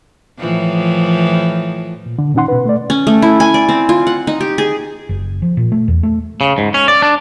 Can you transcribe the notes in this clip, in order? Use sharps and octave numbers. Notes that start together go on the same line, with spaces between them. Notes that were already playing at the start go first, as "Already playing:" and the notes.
A2 E3 F3
A#2
D3
A#2 D#3 C#4 D#4 F#5 C6
B2 B4
A3 D5
C#4
A3
E4
G#5
D5
C4
F4
F#5
D#4
G4
G#4
F#1
F3
A#2
A3
E2
A3
C#3
G#2
C#4
D5
D4